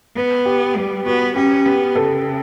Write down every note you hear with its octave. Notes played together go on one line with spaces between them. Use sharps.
B3 B4
G4
G3 G4
B3 F#4
C#4 G4
B3 G4
C#3 A4